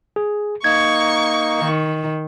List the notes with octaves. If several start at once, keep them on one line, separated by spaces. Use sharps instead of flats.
G#4
A#3 D#4 C#6 G#6
D#3